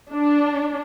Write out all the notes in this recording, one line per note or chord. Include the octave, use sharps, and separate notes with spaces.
D4